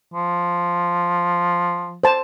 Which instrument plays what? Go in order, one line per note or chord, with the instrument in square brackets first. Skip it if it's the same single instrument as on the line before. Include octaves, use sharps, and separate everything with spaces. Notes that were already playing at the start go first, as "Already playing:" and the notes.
[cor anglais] F3
[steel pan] C5 A5